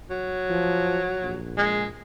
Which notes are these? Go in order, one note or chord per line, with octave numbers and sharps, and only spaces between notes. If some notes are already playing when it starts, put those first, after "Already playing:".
F#3
F3
A#1
G#3